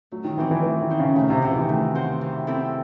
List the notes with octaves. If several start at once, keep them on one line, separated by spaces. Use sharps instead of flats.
F#3 A3
D#3
E3 C4 F#4 C5
E3
E3 A3
D#3
C4 F#4 C5
C#3
C3 A3
C3
C3 C4 F#4 C5
E3
D#3
A3
C4 F#4 C5
E3
C4 E4 A4